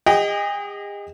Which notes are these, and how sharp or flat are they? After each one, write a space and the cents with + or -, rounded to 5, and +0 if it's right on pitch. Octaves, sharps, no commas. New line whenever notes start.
G#4 -45 D#5 +0 G5 -30